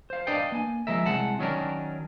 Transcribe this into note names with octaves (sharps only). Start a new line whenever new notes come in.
C5 F5
D4 B4 D5 D#5 F5 G5
A#3 G#5
F3 G#3 A#4 E5
C2 G#3 F#5 A5
D#3 F#3 C#4 D4 E4 A#4